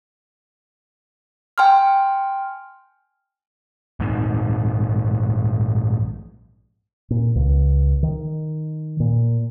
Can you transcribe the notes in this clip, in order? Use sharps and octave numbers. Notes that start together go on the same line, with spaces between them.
G5 G#5 C6 F6
A#1 G#2 D#3
A#2
C#2
D#3
A#2